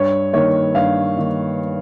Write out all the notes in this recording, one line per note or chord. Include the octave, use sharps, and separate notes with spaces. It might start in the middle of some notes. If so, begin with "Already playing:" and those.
Already playing: G2 C#5
D#3 A#3 C#5
G2 F5
D#3 A#3